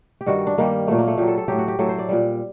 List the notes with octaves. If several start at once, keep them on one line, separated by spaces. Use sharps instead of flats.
G4
G2 D#3 G3 F#4
D4
G2 D#3 G3 A#3
A#2 F#3 A3
A#3
A3
A#2 F#3 G4
A4
A4
A2 F#3 G4
F#4
G4
A2 F#3 A4
C5
D5
A#2 G3